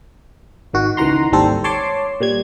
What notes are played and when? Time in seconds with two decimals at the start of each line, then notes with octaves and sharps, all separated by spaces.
0.73 G#1 D#3 F#4
0.97 C#2 D#3 E3 F#5 A#5 C6
1.32 G#1 D#2 G3 C4 A4 C5
1.64 C#5 A5 C6 D6
2.20 A#2 G3 G#6